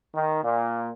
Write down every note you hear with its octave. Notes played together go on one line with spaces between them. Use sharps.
D#3
A#2